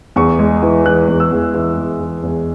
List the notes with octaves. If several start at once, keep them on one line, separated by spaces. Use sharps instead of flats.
E2 C#6
G#3
E3
E3 F#6
E2
E6
E2
E3
E2
E3
E2